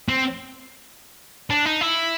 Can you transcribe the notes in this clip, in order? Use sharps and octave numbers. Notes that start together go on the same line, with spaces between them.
C4
D4
D#4
E4